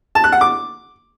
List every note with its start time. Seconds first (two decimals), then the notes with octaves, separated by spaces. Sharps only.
0.15 A5
0.24 F#6
0.32 F#5
0.41 D6